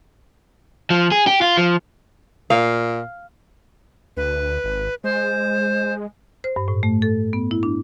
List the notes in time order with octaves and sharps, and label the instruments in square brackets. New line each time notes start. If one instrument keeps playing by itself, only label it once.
[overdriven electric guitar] F3
G#4
G4
F4
F3
[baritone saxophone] A#2 [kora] F5
[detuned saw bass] D2 [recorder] B4
[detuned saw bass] G#1
[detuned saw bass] G#3 [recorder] C5
[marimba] C5
G2
A2
A3
A4
B3
E4
D4